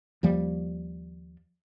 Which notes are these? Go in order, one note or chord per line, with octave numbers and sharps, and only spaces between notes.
D#2 F3 G3